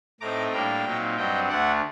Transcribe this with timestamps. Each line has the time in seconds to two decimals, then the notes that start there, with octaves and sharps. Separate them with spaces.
0.21 A2 A3 C4 D#4 A#5 D6
0.52 A2 G3 A#3 D4 G5 A#5
0.85 A#2 F#3 C4 D#4
1.17 G2 F#3 C4 D#5 G5
1.49 D2 D3 A3 D5 F#5